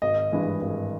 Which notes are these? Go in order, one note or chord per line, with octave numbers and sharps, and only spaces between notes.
G#1 D#5
G2 E3 G#3
G#1